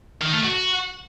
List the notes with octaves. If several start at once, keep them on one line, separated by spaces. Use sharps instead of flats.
D#3
A3
F#4